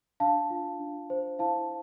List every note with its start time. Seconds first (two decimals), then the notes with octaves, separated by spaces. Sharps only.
0.20 D4 F5 A5
0.50 F4
0.79 D4
1.10 C5
1.39 E4 F5 A5